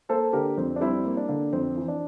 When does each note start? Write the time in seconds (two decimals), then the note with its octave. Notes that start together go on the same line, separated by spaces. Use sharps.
0.09 A#3 A4 C5
0.33 D3 G4 A#4
0.57 F2 C4
0.76 D4
0.80 G3 C4 E4
1.05 A#3
1.17 D4
1.29 D3
1.53 F2 C4
1.77 E3
1.88 D4